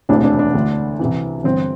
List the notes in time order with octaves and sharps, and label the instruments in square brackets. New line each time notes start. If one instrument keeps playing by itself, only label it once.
[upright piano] E1 D2 C3 E3 D4
D4
D4
D2 D3
C2 C3 E3
G1 G2 E3 C4